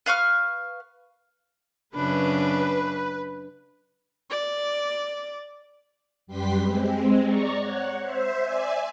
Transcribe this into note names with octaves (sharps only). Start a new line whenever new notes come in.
B4 F5 C#6 F6
F#2 C#3 D4 B4
D5
F#2 G3 G4 B4 C6 B6
G#3 C4
D5 A#5 C#6
C#5 F#5
C5 E5
D5 E5 G#5